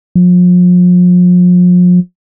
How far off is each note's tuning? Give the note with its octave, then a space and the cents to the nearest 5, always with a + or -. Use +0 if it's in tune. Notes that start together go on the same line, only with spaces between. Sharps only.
F3 +40